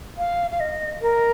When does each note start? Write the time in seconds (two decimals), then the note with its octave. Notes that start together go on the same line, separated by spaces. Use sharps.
0.18 F5
0.51 F5
0.60 D#5
1.02 A#4